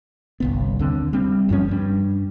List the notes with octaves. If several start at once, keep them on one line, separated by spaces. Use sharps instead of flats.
G1 C2 B3
D#2 D3 C4
G3 C4
F#1 G2 F3 C#4
G2 G3